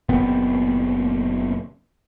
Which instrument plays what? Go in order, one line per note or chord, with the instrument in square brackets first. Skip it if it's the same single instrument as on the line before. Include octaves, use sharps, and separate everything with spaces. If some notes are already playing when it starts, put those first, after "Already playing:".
[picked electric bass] F#1 A#2 B3 C4